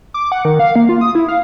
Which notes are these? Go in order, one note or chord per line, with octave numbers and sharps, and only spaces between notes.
D6
F#5
D#3
F5
A#3
F4
D#6
E4
F5